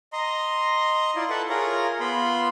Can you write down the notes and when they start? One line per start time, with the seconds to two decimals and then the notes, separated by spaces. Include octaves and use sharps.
0.13 D#5 A#5 C6
1.16 E4 F4 D5
1.30 A4 B4 E5 F#5 A5
1.50 F4 G#4 A#4 C#5 A#5
2.00 B3 F4 B5 C6